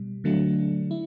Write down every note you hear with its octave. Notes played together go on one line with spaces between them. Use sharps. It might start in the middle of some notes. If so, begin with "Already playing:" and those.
Already playing: B2 G3
D3 F#3 A3 D4
E4